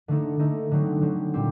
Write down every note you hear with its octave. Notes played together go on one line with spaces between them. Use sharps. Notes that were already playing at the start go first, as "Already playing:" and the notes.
D3 A3 D#4 A4
D3 A3 D#4 A4
D3 F#3 C4
D3 F#3 C4
A#2 G3 C4 G4